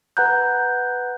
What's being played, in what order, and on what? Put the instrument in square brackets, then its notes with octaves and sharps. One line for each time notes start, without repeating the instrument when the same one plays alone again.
[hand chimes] B4 F#5 A#5 F#6 G6